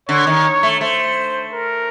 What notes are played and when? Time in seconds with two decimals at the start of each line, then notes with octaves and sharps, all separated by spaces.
0.09 D3 C#5
0.27 D#3
0.63 A3
0.81 A3 C5
1.53 A#4